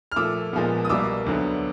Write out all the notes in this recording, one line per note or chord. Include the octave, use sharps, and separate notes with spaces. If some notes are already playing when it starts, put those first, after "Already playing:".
F6
A#2 F3 A3 D6 E6
A#2 F3 G#3 B3
D#6
C2 B2 G3 A#3 D6 E6
D2 D3 F#3 B3